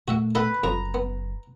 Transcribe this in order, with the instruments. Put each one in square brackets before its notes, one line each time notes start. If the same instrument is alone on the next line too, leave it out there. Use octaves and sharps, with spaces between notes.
[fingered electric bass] A#2 A3 [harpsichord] F#4 E5 F#5
[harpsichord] A4 D#5 F#5 [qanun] B4
[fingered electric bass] F#1 [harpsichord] F2 [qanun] A#5
[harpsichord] B3